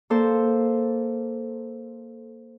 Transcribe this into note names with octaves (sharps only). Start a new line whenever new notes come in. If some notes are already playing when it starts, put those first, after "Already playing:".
A#3 A4 C5